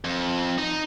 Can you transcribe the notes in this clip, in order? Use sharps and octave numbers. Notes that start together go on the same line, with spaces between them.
F2
D#4